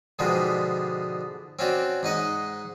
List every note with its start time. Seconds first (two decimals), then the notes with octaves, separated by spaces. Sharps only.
0.19 G#2 B2 D3 F3 G3 G#3
1.59 C4 C#4 F#4 D5
2.03 G#2 D#4 D#5 F#5